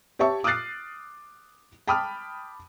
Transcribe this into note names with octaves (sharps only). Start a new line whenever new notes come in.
G4 C#5 E5 A5 C#6
D6 D#6 F6 F#6 A6 C7
G5 A5 B5 D6 D#6 F6